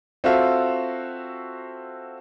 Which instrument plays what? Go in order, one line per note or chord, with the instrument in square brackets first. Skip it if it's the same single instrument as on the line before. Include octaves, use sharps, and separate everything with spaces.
[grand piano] C4 F4 F#4 A4 E5 F5